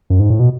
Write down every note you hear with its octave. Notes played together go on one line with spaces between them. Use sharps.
F#2
G#2
A2
B2